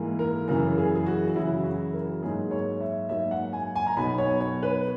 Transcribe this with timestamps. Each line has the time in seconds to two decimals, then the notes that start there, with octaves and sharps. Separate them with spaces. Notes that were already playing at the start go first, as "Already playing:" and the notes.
Already playing: G#2 E3 A#3
0.19 A#4
0.48 F#2 C#3 E3 A#4
0.78 G#4
0.95 G#4
1.06 F#4
1.28 F#4
1.35 F#2 C#3 E3 E4
1.64 F#4
1.93 A#4
2.23 G#2 F#3 A#3 D#4 G#4
2.51 C#5
2.81 E5
3.09 G#2 F#3 A#3 D#4 E5
3.31 F#5
3.53 G#5
3.76 G#5
3.86 A#5
3.97 B1 B2 F#3 B3 D#4 B5
4.18 C#5
4.41 C#5
4.63 B4